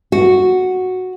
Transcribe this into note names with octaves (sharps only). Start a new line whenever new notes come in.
F#4